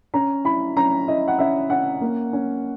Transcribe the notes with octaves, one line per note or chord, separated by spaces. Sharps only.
C#4 A#5
E4 B5
C#4 A#5
E4 D#5
F#5
C#4 E5
C#4 F#5
A#3
C#4